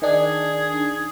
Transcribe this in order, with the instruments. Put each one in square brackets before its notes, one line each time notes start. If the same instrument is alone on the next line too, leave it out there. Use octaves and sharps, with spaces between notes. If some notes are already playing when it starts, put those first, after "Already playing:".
[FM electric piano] D#3 D4 [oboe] G#4